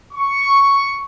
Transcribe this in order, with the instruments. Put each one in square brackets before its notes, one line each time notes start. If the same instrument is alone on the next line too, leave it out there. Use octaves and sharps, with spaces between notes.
[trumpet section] C#6